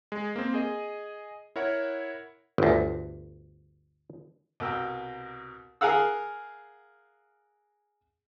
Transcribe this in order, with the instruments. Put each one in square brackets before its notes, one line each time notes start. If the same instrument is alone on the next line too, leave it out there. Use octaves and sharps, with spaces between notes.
[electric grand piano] G#3
A#3 C4
G#4 D#5
E4 A#4 C#5 F#5
[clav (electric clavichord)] G1 D2
[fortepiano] C2 B2 A#4 G5 E6
G#4 A#4 F5 F#5 E6